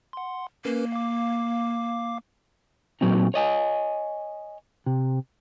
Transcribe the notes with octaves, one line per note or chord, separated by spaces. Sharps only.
F#5 C6
A#3 C#4 A#4 B4
F5 D6
A#2 F#3 C4 D#4
C#5 D#5 G#5
C3